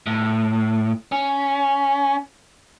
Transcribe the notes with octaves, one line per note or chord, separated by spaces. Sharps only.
A2
C#4